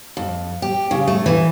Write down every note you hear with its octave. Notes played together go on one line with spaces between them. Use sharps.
F2
G4
C#3
A3
E3